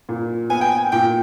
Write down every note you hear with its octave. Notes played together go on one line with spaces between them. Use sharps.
A#2
B3 G#5
G5
G#5
A#2 G5